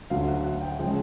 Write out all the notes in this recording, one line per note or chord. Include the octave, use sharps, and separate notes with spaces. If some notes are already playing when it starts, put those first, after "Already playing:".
D2 D3 F#3 A3 F5
F#5
F#5
G5
C#3 F3 G#3 G5